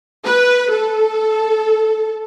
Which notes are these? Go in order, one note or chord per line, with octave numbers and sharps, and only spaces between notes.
B4
A4